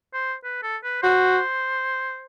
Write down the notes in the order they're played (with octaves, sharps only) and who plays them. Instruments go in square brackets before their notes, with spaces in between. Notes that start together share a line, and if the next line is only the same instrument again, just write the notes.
[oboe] C5
B4
A4
B4
[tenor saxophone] F#4 [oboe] C5